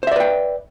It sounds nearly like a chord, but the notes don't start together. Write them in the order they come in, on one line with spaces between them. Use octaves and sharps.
C5 E5 D5 B4 G5